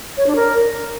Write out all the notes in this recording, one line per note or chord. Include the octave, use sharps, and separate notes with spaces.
C#5
D4
A#4